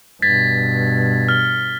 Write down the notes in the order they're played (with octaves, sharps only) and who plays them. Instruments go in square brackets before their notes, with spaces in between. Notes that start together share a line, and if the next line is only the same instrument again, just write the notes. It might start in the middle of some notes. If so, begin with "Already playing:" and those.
[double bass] G2 B2 [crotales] G#6 A6 B6
[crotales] F6 G7